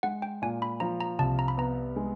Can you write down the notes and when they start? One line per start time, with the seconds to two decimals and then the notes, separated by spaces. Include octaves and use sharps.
0.03 G#3 F#5
0.22 G5
0.42 A#2 G#5
0.62 B5
0.80 F3 A#5
1.01 A#5
1.19 C2 A5
1.39 A#5
1.48 B5
1.57 B3 A#5
1.96 G#3